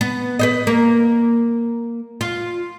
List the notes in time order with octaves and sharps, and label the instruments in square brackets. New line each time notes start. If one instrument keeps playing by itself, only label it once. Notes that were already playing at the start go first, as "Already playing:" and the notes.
[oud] B3
B4 C5 D#5
A#3
F4